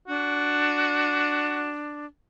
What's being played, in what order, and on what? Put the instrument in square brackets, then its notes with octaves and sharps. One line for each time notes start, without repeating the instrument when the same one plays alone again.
[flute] D4 [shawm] F#4